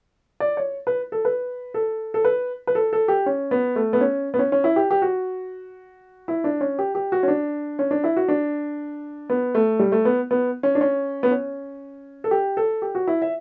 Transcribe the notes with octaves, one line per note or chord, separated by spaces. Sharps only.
D5
C#5
B4
A4
B4
A4
A4
B4
B4
A4
A4
G4
C#4
B3
A3
B3
C#4
B3
C#4
C#4
E4
G4
G4
F#4
E4
D4
C#4
G4
G4
F#4
C#4
D4
C#4
D4
E4
F#4
D4
B3
A3
G3
A3
B3
B3
C#4
D4
C#4
B3
C#4
A4
G4
A4
G4
F#4
E4
E5